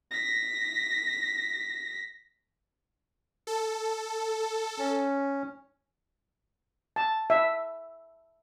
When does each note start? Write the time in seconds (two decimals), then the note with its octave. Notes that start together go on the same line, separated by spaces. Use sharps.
0.11 A#6 B6
3.47 A4
4.78 C#4
6.96 A5
7.30 E5